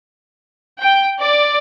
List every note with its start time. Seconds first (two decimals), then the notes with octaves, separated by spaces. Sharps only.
0.80 G5
1.20 D5